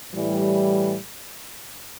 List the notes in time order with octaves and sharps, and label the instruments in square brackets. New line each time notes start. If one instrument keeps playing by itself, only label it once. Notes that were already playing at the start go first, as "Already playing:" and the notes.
[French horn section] A2 E3 G3